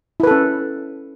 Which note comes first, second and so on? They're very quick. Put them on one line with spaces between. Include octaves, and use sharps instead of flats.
E4 B4 A4 C#4